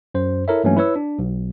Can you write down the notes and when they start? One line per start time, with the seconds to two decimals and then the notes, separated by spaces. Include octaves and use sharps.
0.14 F#2 C5
0.48 E4 A4 A#4 C#5 E5
0.64 G2 E3 F#3 A3 A#3 C#4
0.77 E4 B4 C#5 E6
0.96 D4
1.19 B1